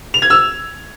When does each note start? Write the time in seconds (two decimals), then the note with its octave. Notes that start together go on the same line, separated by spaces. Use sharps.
0.14 F7
0.22 G#6
0.30 E6